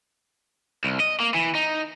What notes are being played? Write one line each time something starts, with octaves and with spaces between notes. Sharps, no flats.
C2
D#5
A#3
E3
D#4